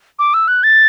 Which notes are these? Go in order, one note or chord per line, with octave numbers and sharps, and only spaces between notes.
D6
E6
F#6
A6